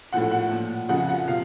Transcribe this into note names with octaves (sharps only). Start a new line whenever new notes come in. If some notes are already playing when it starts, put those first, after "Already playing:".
A2 F3 F#5
F#5
A#2 F3
F2 C#3 F3 F#5
F#5
C3 F3 F5